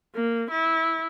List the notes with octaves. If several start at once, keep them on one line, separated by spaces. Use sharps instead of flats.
A#3
E4